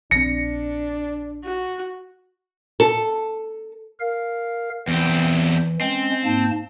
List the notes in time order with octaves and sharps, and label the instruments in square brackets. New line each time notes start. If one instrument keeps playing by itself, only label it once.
[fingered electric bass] A#1 C4 [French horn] D4 [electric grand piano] A#6 C#7
[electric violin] F#4
[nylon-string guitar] A4
[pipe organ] A#4 F5
[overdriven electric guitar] E2 C4 [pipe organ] E3
[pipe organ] G#3 C#4 [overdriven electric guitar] C4
[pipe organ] G#2 A#3 A5